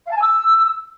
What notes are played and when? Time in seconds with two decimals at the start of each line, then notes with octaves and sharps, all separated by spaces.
0.05 F5
0.10 A5
0.15 G#5
0.21 E6